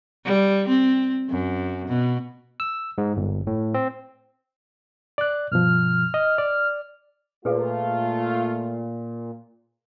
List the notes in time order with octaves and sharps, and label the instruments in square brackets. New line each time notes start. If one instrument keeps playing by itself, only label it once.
[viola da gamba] G3
C4
F#2
B2
[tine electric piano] E6
G#2
G1
A2
C4
[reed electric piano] D5 F#6
[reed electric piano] G2 B2 F3 [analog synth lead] F6
[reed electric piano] D#5
D5
[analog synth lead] A#2 [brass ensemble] A3 F4 [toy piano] G#4 B4